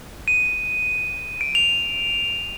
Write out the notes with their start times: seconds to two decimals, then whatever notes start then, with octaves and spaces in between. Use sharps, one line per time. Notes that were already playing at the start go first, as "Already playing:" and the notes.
0.28 D#7
1.41 D7
1.55 F7